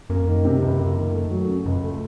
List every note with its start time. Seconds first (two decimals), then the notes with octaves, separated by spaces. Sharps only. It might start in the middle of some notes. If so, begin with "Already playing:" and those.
0.10 F#2 A#3
0.22 F2
0.28 F#2 D#3
0.45 C3
0.62 C#2
0.79 A#3
0.96 D#3
1.13 A3
1.31 F#3
1.48 C#3
1.66 C#2 F#2
1.83 A3